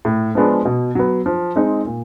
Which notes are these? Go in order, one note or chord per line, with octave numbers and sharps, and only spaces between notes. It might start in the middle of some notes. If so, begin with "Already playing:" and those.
A2
F3 G#3 B3 D4
B2
F#3 B3
F3
G#3 C4 D#4
A#2